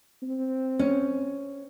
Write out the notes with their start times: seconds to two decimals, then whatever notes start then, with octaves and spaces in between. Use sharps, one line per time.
0.23 C4
0.79 C#4